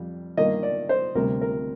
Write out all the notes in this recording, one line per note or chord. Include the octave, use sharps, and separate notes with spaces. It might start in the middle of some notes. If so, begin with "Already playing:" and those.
Already playing: F2 G3
G2 D#3 A#3 D#5
D5
C5
D2 C3 G3 C4 A#4
A#4